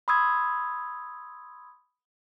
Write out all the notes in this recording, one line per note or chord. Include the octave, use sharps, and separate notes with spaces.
B5 C6 D#6 E6 G#6